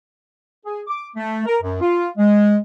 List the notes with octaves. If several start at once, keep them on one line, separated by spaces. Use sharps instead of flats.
G#4
D6
A3
A#4
F#2
F4
G#3